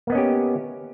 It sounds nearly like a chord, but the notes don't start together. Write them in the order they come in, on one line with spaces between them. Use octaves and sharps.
A#3 B3 D#5 C#4 G4